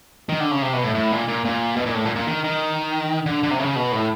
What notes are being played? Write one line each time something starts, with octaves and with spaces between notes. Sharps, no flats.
D#3
D3
C#3
C3
B2
A2
A2
A#2
A#2
A#2
B2
A#2
A2
A#2
A#2
D#3
D#3
D3
D3
C3
C#3
B2
A2